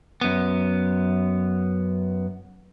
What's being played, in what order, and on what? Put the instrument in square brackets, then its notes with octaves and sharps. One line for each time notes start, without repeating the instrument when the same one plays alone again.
[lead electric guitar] F#2 B3